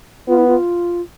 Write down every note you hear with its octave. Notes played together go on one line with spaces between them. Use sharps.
B3 F4
E4
F4